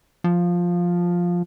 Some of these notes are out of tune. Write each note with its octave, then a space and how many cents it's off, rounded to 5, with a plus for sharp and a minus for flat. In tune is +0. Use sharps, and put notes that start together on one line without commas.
F3 +5